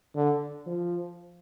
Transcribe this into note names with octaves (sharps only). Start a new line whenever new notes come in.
D3
F3